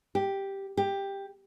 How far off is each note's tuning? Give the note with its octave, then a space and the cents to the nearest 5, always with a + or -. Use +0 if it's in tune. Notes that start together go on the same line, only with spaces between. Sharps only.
G4 +0
G4 +10